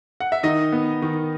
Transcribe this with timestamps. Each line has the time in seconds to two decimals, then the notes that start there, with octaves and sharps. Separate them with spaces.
0.20 F#5
0.32 E5
0.43 D#3 D#4 D#5
0.72 B3
1.02 D#3